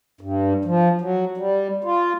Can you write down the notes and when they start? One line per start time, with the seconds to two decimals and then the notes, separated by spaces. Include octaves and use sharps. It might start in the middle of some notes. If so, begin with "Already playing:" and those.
0.21 G2
0.65 F3
1.01 F#3
1.38 G3
1.84 F4